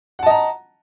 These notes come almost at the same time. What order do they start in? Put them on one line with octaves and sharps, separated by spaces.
F#5 A5 D#5 A#5